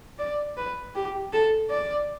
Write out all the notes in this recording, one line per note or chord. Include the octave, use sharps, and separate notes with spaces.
D5
B4
G4
A4
D5